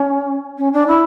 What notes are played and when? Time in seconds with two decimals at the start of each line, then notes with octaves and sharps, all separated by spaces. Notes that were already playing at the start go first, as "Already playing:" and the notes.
Already playing: C#4
0.58 C#4
0.73 D4
0.88 E4